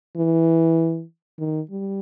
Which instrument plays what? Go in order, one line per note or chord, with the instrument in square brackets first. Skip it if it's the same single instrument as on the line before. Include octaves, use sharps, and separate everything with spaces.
[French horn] E3
D#3
G3